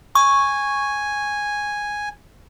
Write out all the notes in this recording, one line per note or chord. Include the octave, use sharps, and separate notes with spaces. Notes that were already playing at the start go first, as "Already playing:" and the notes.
G#5 C#6